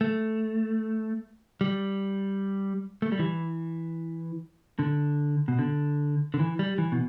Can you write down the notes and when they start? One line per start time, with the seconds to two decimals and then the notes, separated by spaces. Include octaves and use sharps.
0.01 A3
1.61 G3
3.02 A3
3.12 G3
3.19 E3
4.79 D3
5.48 B2
5.59 D3
6.34 D3
6.39 E3
6.59 G3
6.78 E3
6.92 B2